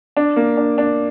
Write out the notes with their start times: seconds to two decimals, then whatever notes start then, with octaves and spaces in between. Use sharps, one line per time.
0.17 D4
0.36 A#3
0.57 D4
0.78 D4